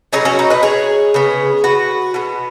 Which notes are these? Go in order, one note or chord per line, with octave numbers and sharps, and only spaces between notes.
B2 F#3 C#4 D#4 G#4
C#4 F#4
D#4
B4 D#5
G#4 C#5
C#3 B3
F#4 B4
B2 B3